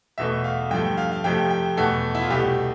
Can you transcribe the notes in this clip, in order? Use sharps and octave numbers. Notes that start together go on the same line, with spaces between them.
E2 B2 A3 E5
F5
G2 F3 A3 G5
F5
F5
F2 C3 F3 A3 G5
G5
E2 B2 A3 A4
E4
F4
C2 B2 A3 G4